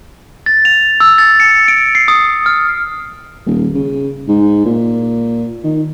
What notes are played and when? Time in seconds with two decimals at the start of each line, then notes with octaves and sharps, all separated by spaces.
0.46 A6
0.65 F7
1.00 E6
1.18 A6
1.40 C#7
1.68 D7
1.95 C7
2.08 D#6
2.46 F6
3.46 D#1
3.75 C#3
4.28 G#2
4.65 A#2
5.64 D#3